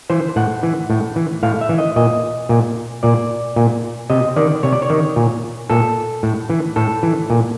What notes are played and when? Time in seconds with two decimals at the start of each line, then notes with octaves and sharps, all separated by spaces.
0.10 E3 C5
0.36 A2 F#5
0.63 E3
0.90 A2
1.16 E3
1.43 A2 F5
1.61 E5
1.69 E3
1.78 D#5
1.96 A#2 D#5
2.49 A#2
3.03 A#2 D5
3.56 A#2
4.10 C3 D#5
4.36 D#3 D5
4.63 C3 C#5
4.72 D5
4.82 C#5
4.90 D#3
5.16 A#2
5.70 A#2 A4
6.23 A2
6.50 E3
6.76 A2 A4
7.03 E3
7.30 A#2